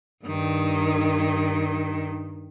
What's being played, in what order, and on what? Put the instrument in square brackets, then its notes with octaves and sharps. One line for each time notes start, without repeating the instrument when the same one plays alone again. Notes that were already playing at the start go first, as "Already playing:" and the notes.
[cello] G2 D#3